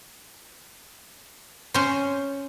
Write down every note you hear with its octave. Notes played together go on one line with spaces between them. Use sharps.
C#4 C5